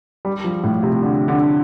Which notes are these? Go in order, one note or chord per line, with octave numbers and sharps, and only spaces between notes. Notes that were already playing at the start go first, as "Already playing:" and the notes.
G3
F3
A2
C3
D3
D3